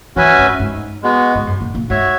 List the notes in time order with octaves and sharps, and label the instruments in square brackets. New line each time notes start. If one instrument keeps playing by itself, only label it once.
[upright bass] E3 [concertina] C#4 F#4 B4 E5 G#5
[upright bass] G#2
G#2
[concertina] G#3 B3 F#4
[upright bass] G#2
F#2
A#2
A#2
[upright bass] G#2 [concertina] F#4 C#5 E5